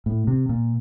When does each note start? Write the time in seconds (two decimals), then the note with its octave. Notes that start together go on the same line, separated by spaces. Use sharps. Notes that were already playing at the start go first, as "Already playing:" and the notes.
0.06 A2
0.27 C3
0.49 A#2